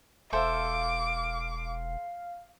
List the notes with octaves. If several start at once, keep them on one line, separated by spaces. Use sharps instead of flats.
E1 A4 C5 E5 F5 D6